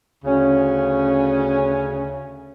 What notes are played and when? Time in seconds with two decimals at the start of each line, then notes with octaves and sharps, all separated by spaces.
0.24 D2 C#3 C#4